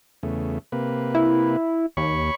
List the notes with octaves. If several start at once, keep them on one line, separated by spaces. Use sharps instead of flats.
E2 C#3 A3
C3 A#3 B4
E4
D#2 C#5 B5 C#6